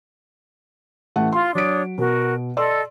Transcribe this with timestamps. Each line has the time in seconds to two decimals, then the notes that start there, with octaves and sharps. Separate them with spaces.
1.16 A1 A3 F#5
1.32 F4 C6
1.55 F#3 D4 C#5 D#6 D7
1.98 B2 F#4 A#4
2.57 A4 D5 D#5 C6 E6